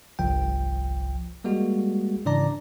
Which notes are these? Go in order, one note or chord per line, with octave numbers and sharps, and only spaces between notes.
G1 C2 F3 G5
G3 G#3 A#3 F#4
G#2 C#3 E3 D4 D5 A#5